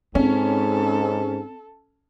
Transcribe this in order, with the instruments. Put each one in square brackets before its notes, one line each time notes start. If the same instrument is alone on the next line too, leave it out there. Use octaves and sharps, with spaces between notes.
[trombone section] G#2 [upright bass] C4 [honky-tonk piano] C#4 [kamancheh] A4